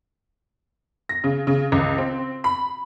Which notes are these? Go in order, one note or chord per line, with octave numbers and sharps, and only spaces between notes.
A#6
C#3
C#3
C#2
C4
B5